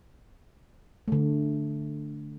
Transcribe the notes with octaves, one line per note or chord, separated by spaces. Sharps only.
D3 A3